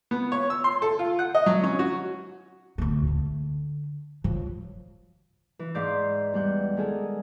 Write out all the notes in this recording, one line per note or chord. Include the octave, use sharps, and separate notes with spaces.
B3
C#5
E6
C6
A4
F4
F#5
D#5
F#3
C#4
F#4
D2 A3
D3
F3 F#3
E3
G#2 B4 D5 F5 C6 G6
E2 G3 G#3 F#5 G6
D#3 G#3 G#4 A4